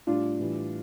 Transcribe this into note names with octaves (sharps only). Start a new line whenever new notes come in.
A2 G3 D4 F4
A2 E3 G3